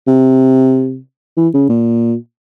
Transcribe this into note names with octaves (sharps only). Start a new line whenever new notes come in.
C3
E3
C#3
A#2